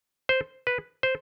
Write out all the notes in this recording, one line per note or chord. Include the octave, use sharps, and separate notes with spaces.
C5
B4
C5